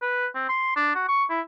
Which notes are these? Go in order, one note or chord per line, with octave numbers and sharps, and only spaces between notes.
B4
C4
C6
D4
F#4
C#6
E4